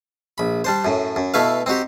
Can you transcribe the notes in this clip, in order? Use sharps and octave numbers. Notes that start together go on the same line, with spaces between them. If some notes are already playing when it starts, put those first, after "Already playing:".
A#1 B5
G3 D4 C5
F#2 A2
F#2
B2 A3 E4 B4 F5
C4 D#4 F#4 G4